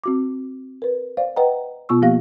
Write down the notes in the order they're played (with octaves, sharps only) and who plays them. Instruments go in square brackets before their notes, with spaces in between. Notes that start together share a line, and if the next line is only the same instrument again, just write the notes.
[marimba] C4 F#4 D6
A#4 B4
C5 D5 F5
B4 D#5 F#5 G5 A#5
B2 B3 F4 C#6 E6
F3 A#3 B3 G4 F5 A#6